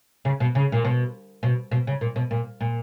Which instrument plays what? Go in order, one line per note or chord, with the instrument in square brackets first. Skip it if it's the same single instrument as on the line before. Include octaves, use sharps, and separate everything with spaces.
[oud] C#3
B2
C#3
A#2
B2
B2
B2
C#3
A#2
B2
A#2
A#2